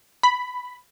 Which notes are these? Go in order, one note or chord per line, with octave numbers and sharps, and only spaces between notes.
B5